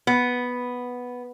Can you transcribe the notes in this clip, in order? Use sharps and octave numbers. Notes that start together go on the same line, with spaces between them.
B3